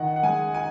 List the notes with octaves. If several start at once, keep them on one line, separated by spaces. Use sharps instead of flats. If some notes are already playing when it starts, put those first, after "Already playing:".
Already playing: D#3 D#4 F#5
F#5
G#3 G#5
G#5